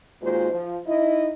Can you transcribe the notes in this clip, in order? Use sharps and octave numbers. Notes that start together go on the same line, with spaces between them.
D#2 A#2 G#3 F4 F#4 C5
F3
D#4 E4 D#5